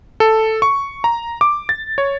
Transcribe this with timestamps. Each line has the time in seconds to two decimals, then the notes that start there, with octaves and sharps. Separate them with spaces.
0.20 A4
0.62 C#6
1.04 A#5
1.41 D6
1.69 A6
1.98 C#5